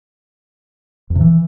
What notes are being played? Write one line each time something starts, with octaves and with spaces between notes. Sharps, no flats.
F2
C3
E3